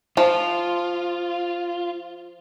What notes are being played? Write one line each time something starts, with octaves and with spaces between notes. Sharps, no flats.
F3 F4